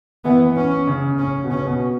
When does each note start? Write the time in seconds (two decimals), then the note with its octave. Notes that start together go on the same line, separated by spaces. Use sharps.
0.25 E3 B3
0.56 C#4
0.87 C#3
1.18 C#4
1.44 B2
1.50 C#3 C#4
1.66 B2